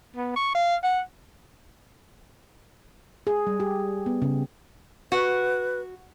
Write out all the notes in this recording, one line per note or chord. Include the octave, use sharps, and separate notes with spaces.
B3
C#6
F5
F#5
G#4
G3
G4
B3
C#3
F#4 B4